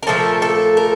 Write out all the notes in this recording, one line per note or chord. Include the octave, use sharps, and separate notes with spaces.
A#4
A#2 F3 A3 A4
A4
A#4